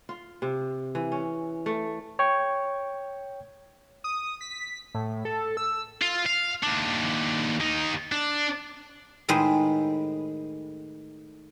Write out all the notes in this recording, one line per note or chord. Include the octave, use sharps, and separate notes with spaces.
F4
C3
E3
C#4
A3
C#5 G5 C#6
D#6
B6
A2
A4
E6
F4
F5
D#2 D4
D#2 D#4
D4
A2 D#3 G#3 B4 C5